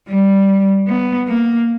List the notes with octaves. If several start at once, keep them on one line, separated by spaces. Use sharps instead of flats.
G3
B3
A#3